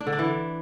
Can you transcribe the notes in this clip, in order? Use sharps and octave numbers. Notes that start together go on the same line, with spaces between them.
D4
D3
D4
E3